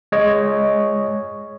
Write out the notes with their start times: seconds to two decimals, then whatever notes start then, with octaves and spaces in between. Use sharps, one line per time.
0.12 G#3 C#5 D#5